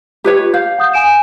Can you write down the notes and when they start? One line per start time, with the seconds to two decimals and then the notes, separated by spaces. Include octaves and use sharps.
0.24 F4 G4 B4 C#5
0.54 F5 G6
0.79 F#5 D#6 G6
0.94 G#5 D7 E7